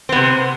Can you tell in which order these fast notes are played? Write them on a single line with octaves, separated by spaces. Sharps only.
C4 B3 C3